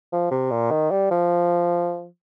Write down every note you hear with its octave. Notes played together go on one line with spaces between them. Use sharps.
F3
C3
A#2
D#3
G3
F3